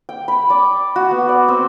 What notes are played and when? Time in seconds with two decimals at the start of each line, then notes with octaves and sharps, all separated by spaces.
0.09 G5
0.28 B5
0.50 D5
0.96 F#4
1.11 B3
1.29 D5
1.48 C4